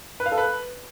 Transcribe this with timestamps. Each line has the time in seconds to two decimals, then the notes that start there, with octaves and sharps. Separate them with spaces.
0.20 B4
0.26 F5
0.32 A4
0.38 B4